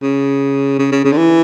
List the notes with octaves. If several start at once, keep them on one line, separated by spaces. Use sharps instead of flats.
C#3
C#3
C#3
C#3
D3
E3